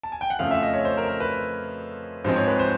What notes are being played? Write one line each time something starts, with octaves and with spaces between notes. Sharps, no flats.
A5
G#5
G5
F#5
F2 C#3 F3 A3 F5
E5
D#5
C#5
C5
A#4
A#4
B4
G#2 F3 G#3 C4 C5
C#5
B4
C5